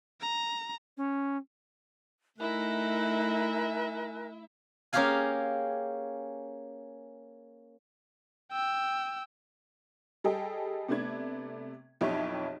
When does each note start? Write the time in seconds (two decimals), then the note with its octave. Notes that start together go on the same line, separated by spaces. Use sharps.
0.21 A#5
0.97 C#4
2.40 A3 D#4 E4 A#4 E5 G#5 F#6
4.93 A#3 C#4 G4 G#4 F5 G#5
8.52 G5 E6
10.24 G3 G#4 A4 D#5 G5
10.88 C3 A3 B3 D4 G#6
12.01 B1 F2 E4 G4 C#5